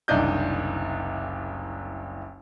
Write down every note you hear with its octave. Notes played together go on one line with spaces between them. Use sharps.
F#1 C2 D#3 D4 D#5 G6